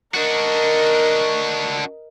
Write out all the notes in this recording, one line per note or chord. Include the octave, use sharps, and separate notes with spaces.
D4 F#4 A#4 D#5